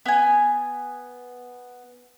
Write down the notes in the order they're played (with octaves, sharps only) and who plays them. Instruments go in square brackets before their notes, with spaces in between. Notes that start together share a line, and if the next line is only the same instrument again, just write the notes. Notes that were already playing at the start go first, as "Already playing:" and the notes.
[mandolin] B3 G#5